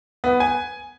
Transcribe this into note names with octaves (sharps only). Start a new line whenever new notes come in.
B3
G#5